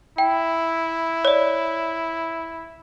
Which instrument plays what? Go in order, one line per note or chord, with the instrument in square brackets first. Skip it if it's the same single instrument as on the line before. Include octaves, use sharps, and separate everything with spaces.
[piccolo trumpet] E4 [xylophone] G5
[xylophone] C#5 D5